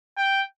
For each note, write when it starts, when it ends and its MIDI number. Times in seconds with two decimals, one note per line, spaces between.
0.17 0.42 79